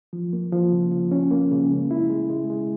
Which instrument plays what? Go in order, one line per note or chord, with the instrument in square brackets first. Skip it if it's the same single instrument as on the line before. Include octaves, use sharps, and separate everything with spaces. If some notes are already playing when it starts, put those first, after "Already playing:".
[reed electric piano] F3
A#3
F3
C#3
F3
C#4
A#3
C#3
G#3
E4
G#3
G#3
G#3